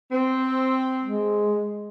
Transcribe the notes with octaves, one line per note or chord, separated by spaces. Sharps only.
C4
G#3